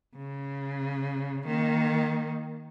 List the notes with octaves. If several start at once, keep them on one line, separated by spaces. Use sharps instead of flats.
C#3
D#3 A#3